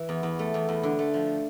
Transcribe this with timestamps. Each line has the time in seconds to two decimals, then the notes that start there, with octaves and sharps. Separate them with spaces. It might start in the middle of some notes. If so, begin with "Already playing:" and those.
Already playing: E3 E5
0.09 E2
0.23 E2
0.39 A3
0.54 E2
0.69 E2
0.83 D3
0.99 A3
1.14 F3